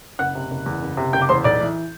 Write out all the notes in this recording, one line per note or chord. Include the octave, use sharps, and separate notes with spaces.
F#1 F#5 F#6
C3
F#1
E2
F#1
C3
F#1 G5 G6
D6
E2 C5 C6
B1 D5 D6
E3